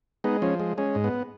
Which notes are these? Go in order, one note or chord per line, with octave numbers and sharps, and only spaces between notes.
G#3 B3 D#4
F3 C#4
G#3
G#3 C#4
G#2
B3